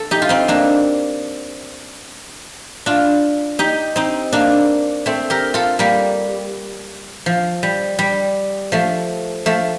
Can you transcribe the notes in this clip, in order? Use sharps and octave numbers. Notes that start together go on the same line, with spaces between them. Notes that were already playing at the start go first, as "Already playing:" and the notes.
Already playing: A4
D#4 G4
F4
C4 D#4
A#3 D4
D4 F4
D#4 G4
C4 D#4
A#3 D4
A3 C4
G4 A#4
F4 A4
G3 A#3
F3
G3
G3
F3 A3
F3 A3